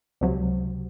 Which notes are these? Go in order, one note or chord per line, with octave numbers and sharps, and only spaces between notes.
C#2 C3 F#3